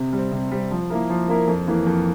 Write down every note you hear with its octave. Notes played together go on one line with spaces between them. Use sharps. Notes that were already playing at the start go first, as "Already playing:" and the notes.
Already playing: C3
G3 C4
C3
G3 C4
F3
A#3 E4 A#4
F3
A#3 E4 A#4
F2
E3 A#3
F2